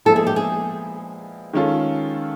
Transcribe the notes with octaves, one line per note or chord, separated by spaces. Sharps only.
A#2 F3 G#3 B3 E4 A4
G#4
G4
G#4
D#3 G#3 C#4 F4 A4